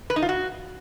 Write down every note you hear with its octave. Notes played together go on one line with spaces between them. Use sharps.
B4
D#4
F4
F#4